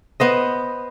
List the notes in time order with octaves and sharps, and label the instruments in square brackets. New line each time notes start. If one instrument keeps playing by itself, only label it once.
[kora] B3 C5 D#5